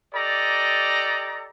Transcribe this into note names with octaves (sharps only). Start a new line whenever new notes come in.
G4 A4 D5 D#5 A#5